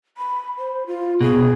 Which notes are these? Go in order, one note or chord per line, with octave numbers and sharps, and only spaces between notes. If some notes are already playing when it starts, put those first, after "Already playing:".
B5
C5
F4
B2 G#4